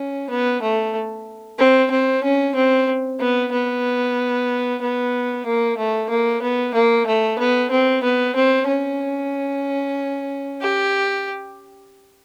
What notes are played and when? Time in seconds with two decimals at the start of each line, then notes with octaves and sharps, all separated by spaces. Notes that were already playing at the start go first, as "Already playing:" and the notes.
Already playing: C#4
0.30 B3
0.62 A3
1.59 C4
1.91 C4
2.23 C#4
2.55 C4
3.19 B3
3.52 B3
4.81 B3
5.45 A#3
5.77 A3
6.09 A#3
6.42 B3
6.74 A#3
7.06 A3
7.38 B3
7.71 C4
8.03 B3
8.35 C4
8.68 C#4
10.61 G4